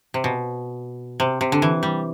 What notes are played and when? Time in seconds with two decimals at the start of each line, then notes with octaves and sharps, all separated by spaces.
0.14 C3
0.24 B2
1.20 C3
1.41 C3
1.52 D3
1.62 E3
1.83 G3